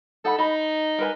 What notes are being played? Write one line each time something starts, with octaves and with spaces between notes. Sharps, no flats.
D#4 A4 F#5 B5
D#4 D#5 B5
A#4 B4 G#5